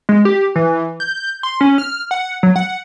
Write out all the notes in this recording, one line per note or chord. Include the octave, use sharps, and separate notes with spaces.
G#3
G4
E3
G6
C6
C#4
F6
F#5
F#3
F#5